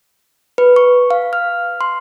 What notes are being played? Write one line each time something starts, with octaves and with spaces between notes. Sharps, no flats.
B4
C#6
F5
F6
C6